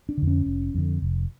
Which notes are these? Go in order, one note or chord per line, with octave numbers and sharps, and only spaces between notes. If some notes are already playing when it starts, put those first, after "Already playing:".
D4
F2 D3
C#4
F1
F2 D3
F1